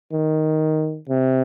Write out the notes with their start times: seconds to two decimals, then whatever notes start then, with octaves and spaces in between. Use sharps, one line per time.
0.12 D#3
1.09 C3